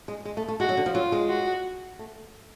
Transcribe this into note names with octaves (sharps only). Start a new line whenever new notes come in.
G#3
G#3
A3
A3
G#3 F#4
F#3
D3
F3
F#3 F4
G#3
F#4
A3